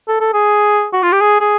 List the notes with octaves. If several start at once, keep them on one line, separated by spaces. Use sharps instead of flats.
A4
A4
G#4
F#4
F4
G4
G#4
G#4